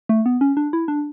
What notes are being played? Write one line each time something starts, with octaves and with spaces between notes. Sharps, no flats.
A3
B3
C#4
D4
E4
D4